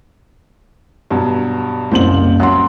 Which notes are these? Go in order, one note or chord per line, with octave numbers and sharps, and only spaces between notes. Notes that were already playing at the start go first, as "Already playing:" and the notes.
G2 B2 F#3
F#1 C2 A#2 C5 F#7
F#2 F#5 C6